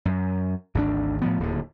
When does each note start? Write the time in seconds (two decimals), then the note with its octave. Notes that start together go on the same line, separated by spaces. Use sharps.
0.05 F#2
0.75 G#1 D2 C#3 D4
1.22 A2 F3 B3
1.40 D1 D#2 D3